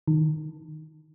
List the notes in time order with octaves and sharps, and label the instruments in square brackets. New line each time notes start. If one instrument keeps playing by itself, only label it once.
[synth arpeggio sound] D#3